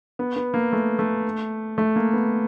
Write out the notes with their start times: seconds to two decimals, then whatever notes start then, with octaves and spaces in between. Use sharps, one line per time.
0.19 B3
0.36 B3
0.54 A#3
0.73 A3
0.99 A3
1.78 A3
1.96 A#3
2.13 B3